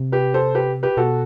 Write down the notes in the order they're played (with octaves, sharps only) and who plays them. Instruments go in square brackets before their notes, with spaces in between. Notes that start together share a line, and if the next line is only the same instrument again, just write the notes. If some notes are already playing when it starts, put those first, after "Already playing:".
Already playing: [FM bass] C3
[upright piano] G4 B4
A4 C5
G4 B4
G4 B4
[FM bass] B2 [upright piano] F#4 A4